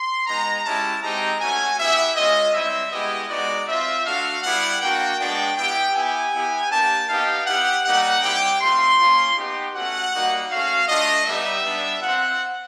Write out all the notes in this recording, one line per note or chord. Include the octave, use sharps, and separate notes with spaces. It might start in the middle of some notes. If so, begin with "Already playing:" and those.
Already playing: C6
G#3 B3 D#4 A#5
G#3 C#4 E4 G4 A5
G#3 C4 D#4 G4 A#5
A3 C#4 F#4 G#5
B3 E4 G4 E5
G#3 C#4 F4 D#5
G3 C4 E4 E5
G#3 B3 E4 G4 D#5
G#3 B3 D#4 F#4 D5
C4 F4 E5
A3 D4 F#4 F5
G3 B3 E4 G4 F#5
A#3 D4 F#4 G5
G#3 B3 D4 F#4 G5
B3 E4 G4 G5
B3 E4 G4 G#5
B3 E4 G4
A#3 D4 G4 A5
B3 D#4 G4 F5
B3 E4 G4 F#5
G3 A#3 D#4 G4 F#5
G3 C4 E4 G4 G5
A3 C4 F4 C6
A#3 C#4 F4
B3 D#4 G4
A3 C#4 F#4 F#5
G3 A#3 D#4 F#4
A3 C#4 F#4 F5
A3 D4 F4 D#5
G3 B3 D#4 G4 E5
G3 B3 D4
C4 F4 F#5